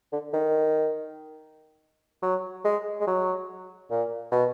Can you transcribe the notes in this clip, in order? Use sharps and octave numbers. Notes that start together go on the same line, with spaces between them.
D3
D#3
F#3
G#3
G#3
F#3
A#2
B2